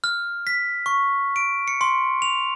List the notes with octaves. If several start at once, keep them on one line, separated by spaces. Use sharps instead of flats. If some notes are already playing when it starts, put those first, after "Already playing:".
F6
B6
C#6
D7
C#7
C6
F7